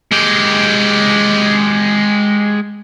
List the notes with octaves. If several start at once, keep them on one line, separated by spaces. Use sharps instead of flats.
G#3 G4